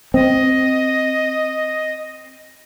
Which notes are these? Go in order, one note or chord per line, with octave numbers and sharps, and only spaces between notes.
C4 D#5